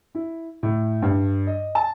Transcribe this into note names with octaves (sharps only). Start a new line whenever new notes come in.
E4
A2
G2
D#5
A5